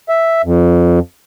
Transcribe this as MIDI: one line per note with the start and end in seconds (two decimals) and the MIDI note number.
0.09 0.42 76
0.45 0.99 41